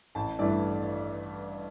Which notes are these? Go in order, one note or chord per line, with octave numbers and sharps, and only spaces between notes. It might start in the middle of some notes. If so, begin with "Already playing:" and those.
A1 A5
G2 E3 A3 D4 D5